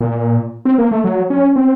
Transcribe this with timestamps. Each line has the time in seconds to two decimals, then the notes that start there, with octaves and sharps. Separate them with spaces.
0.01 A#2
0.65 C4
0.78 A#3
0.91 A3
1.04 F#3
1.30 C#4
1.56 C4